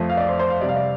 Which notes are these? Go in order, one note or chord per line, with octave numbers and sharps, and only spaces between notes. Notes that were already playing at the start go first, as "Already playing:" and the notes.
Already playing: F2 F3 A3
F5
D5
C5
C5
F5
C3 G3 D5
F5
D5